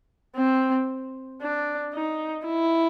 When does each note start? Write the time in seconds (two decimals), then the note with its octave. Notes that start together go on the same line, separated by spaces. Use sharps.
0.36 C4
1.42 D4
1.94 D#4
2.46 E4